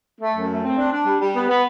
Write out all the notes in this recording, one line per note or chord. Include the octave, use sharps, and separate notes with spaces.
A3
F#2
A3
C4
D4
D4
G3
G3
B3
B3